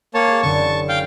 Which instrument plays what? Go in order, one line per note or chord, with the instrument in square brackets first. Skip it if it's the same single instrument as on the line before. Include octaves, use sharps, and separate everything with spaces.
[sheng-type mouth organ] A#3 C#5 A5 [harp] G5
[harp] G#4
[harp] F#1 D3 [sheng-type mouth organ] A5 C#6
[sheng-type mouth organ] F5 G5